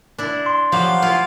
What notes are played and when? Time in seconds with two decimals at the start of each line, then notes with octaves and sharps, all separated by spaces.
0.18 D4 E4
0.46 C6
0.72 F3 F#3 G4 F5
1.02 E4 F4